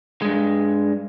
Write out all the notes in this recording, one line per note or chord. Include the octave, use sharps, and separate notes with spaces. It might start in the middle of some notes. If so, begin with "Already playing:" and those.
G2 G#3